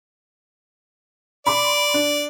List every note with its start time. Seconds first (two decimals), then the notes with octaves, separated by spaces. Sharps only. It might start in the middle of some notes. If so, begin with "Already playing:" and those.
1.47 D5 B5 C6 D6
1.94 D4